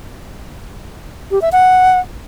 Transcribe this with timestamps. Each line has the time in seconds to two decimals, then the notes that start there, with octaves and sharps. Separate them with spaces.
1.31 G4
1.42 E5
1.52 F#5